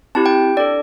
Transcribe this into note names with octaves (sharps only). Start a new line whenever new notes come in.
C4 E4 G4 A5
G5
D4 A4 D5